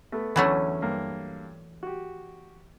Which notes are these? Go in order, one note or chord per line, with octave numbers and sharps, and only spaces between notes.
A3 B3
E2 D3 E3 F#3 A3 C#4
G2 A#3
F#4 G4